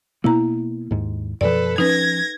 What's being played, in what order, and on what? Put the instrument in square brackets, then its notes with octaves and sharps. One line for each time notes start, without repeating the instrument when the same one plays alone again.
[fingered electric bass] B2 A#3 B3 [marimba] E4 A#5
[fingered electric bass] D#2 G#2
[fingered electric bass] F#2 B2 F3 [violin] A4 B4 [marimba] D5
[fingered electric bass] F3 C#4 [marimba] D#4 B4 [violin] G#6 A#6